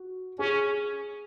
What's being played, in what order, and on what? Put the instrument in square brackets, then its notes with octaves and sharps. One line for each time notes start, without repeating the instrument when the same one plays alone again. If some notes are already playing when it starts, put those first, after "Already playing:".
Already playing: [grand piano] F#4
[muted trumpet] C#4 [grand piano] G#4